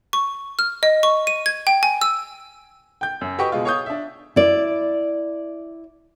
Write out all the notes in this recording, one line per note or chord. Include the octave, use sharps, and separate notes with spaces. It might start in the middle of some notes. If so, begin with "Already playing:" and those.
C#6
F6
D#5
C#6
D#7
G#6
G5
G#5
E6
G5 G6
F#2
F#4 G4 B4 D#5 G5 C#6
B2 G#3 F4
C#5 F5 C#6 D#6 G6
D4 E5
E4 D5